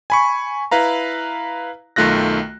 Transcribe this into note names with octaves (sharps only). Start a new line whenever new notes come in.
G#5 B5 C#6
E4 B4 F5 A#5
B1 D#3 A3 F4 F#6 A#6